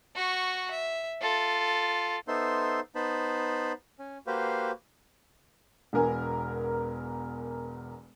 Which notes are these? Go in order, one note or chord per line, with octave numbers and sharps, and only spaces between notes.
F#4 C#6
E5
F4 A4
B3 D#4 A4 C5 E5 C6
B3 D#4 C5 A5 B5
C#4
A#3 F#4 G4 B4 C5 F5
E1 E2 A#4 G#5